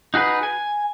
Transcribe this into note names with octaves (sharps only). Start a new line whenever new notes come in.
D#4 F#4 G#4 B4
G#5